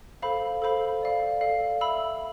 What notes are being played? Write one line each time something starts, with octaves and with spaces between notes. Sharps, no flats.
A4 C5 F5 B5
A4 C5 F5 B5
A4 D5 F5
A4 D5 F5
E5 B5 E6